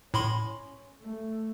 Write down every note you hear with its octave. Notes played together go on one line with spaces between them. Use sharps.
A2 C#4 B5 C6
A3